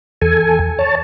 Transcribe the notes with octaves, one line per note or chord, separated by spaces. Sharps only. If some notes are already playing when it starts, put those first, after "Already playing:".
E2 A4 G#5
C#5 A5